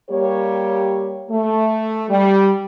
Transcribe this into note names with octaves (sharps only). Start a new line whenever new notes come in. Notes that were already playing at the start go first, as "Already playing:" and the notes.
G3 A#3 G4 C#5
A3
G3